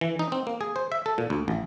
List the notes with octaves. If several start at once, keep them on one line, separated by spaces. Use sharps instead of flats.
E3
D#4
C4
A#3
G#4
C5
E5
A4
A#2
D2
A1